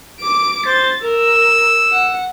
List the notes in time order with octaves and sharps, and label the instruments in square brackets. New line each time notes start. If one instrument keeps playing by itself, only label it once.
[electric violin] D6 D7
[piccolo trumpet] C5 [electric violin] A6
[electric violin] A#4 [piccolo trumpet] E6
[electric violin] F#5